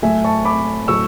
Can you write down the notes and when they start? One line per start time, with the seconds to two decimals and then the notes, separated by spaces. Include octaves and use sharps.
0.02 A2 F#3 A3 E5 G#5
0.24 A5 C#6
0.45 B5 D6
0.88 A2 F#3 A3 C#6 E6